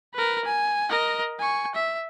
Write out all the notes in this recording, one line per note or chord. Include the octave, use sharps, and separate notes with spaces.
A#4 B4
G#5
A#4 D#5
G#5 C#6
E5